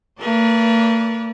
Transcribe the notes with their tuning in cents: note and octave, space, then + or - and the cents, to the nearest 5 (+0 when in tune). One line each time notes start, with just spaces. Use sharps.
A#3 -45 B4 -40 D5 -10